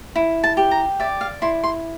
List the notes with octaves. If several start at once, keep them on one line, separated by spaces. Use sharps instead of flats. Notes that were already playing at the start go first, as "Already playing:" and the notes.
E4
A5
G4
A#5
D5 E5
F5
E4 C6
C6